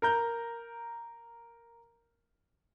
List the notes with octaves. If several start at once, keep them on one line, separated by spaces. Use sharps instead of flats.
A#4 A#5 G6